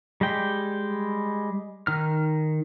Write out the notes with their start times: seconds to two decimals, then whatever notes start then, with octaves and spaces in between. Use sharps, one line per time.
0.21 G3 G#3 G5
1.87 D#3 F6